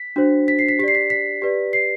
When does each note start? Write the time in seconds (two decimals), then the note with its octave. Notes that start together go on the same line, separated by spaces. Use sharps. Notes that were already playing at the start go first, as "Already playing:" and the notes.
Already playing: B6
0.16 D4 F#4 C5
0.48 B6
0.59 C7
0.69 B6
0.79 G4 B6
0.83 D5 C7
0.95 B6
1.10 B6
1.42 G4 B4 D5
1.73 C7